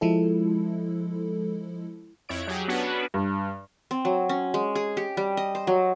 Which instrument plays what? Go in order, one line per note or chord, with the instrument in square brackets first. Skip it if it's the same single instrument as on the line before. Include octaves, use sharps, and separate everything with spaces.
[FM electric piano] F3 G#3 E4 A4
[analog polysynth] F2 E4 C#5 D7
F#3 G4 G#4
B3 C#4 D4 F#4 B4
[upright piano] G2
[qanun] C4
F#3
C#4
G#3
G#4
G4
G3
D#5
C5
F#3